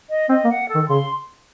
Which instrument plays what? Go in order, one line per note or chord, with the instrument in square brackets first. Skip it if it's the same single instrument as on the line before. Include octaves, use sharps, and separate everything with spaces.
[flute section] D#5
[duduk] C4 [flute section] D#5
[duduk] A#3
[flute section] F#5
A4
[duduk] D#3
[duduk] C#3 [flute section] C6